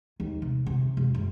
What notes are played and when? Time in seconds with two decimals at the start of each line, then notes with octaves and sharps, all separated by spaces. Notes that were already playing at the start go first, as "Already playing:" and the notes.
0.20 D#2
0.42 C3
0.66 C3
0.97 E1
1.14 F#1